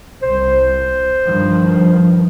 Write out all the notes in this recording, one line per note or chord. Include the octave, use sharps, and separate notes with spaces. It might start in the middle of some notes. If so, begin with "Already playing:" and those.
C2 C5
G2 D#3 F3